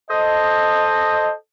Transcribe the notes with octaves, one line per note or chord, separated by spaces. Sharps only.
A4 C5 D#5